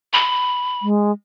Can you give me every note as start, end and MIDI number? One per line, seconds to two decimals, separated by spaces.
0.13 0.86 83
0.82 1.11 56